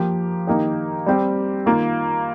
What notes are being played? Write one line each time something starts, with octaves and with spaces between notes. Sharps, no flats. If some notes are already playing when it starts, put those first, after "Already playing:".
Already playing: F3 A#3 G4
D#3 A#3 D#4 G4
G3 C4 G4
D#3 A#3 F4